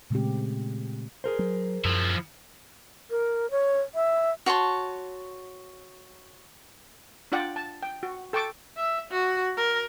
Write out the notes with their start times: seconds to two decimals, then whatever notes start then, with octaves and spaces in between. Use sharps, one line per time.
0.10 A#2 C#3 G#3 A3 C4 G4
1.24 G#4 A#4 C5
1.39 F#3
1.85 F#2 F3 E4
3.11 A#4
3.51 C#5
3.95 E5
4.46 F#4 C#5 A5 C6
7.32 D4 F4 D5 F#5 G5
7.56 A5
7.83 G5
8.03 F#4
8.33 A4 G5 A5 C#6 D6
8.77 E5
9.11 F#4
9.57 A#4